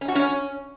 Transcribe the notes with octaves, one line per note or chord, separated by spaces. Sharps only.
C#4
F#4
C#4